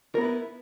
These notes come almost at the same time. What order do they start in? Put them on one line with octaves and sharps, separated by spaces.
A#4 B3 E4 B4